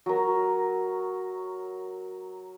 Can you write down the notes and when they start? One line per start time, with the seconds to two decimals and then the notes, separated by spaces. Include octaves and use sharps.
0.06 F#3 A#4